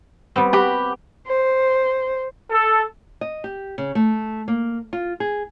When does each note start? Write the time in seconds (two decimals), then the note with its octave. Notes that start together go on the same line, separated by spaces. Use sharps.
0.36 G3 B3 C4
0.53 F#4 G4 F#5 B5
1.27 C5
2.51 A4
3.21 D#5
3.44 G4
3.78 C#3
3.95 A3
4.48 A#3
4.93 F4
5.20 G#4